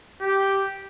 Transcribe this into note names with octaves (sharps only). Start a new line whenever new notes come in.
G4